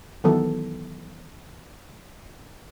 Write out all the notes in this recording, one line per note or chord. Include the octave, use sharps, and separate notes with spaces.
D#3 E3 F#3 B3 A4